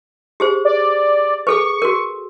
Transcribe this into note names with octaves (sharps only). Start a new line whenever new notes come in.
G4 G#4 C5
D5
G#4 A4 B4 C#6
F#4 A#4